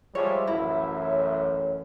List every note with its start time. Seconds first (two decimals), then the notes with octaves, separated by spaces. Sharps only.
0.15 F3 G3 G#3 C#5 E5
0.47 A1 F#2 E4
1.04 C#5